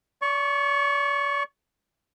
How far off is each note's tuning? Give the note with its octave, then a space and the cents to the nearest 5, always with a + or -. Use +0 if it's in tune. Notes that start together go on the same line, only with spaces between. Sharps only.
D5 -40 C#6 +0